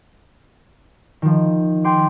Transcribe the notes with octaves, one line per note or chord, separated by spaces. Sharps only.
D#3 F3
G5 G#5 C6 D6